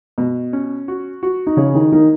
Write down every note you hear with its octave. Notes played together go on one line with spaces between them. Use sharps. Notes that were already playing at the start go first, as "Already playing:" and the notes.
B2
C#4
F#4
F#4
D#4
C#3 C#4 G#4
D#3 D#4
D#3 A#3 D#4